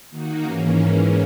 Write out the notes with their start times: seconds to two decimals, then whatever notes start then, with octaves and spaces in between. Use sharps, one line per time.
0.10 D#3 A#3 D#4 F#4
0.43 G#2 E3 A#3 C#4